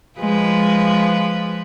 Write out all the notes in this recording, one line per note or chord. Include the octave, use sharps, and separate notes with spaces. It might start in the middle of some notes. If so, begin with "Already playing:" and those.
F3 G#3 B4